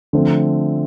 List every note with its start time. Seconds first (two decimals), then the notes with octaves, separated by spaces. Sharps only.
0.13 D3 F3 A3 C4